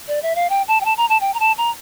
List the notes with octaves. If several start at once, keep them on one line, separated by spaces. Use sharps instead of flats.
D5
E5
F5
G5
A5
G5
A5
A#5
A5
G5
A#5
A5
A#5